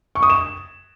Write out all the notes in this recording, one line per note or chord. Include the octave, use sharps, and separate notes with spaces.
C#6
D#6
E7